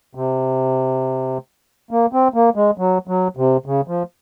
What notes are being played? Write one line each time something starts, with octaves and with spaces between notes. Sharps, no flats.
C3
A#3
C4
A#3
G#3
F#3
F#3
C3
C#3
F3